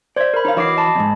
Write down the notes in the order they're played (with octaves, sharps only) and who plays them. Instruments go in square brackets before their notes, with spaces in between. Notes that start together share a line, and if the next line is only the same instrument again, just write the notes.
[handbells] C5 G#6 [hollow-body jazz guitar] D5 E5
[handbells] A#4 B5
[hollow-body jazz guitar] D#4 C#5 F5
[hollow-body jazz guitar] E3 F#4 C#5 [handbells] D#5 D6 C7
[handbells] D#5 A5 B5
[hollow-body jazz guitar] E2 G#2